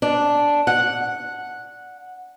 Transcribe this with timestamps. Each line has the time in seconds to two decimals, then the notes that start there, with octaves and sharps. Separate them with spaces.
0.02 D4
0.67 F#5